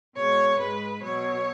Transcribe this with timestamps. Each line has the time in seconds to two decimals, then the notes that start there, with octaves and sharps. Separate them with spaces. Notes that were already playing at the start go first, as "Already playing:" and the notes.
0.15 B2 G#3 C#5
0.58 G#2 G#3 B4
1.01 B2 F#3 C#5